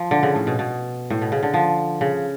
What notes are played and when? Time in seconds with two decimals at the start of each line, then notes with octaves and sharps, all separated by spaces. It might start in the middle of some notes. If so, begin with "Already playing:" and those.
Already playing: F3
0.11 D3
0.23 C#3
0.35 A2
0.47 B2
0.59 B2
1.10 A2
1.22 B2
1.32 C#3
1.43 D3
1.54 F3
2.01 C#3